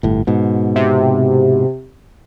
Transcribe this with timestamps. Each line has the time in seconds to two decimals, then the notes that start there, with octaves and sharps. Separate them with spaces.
0.03 G1 A2
0.27 G#2 B2
0.76 C3